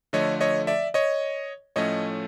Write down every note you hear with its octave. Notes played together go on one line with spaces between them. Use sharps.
D3 F3 A3 C#5 D#5
C#5 D#5
D5 E5
C#5 D#5
A2 F3 A3 C#4 C#5 D#5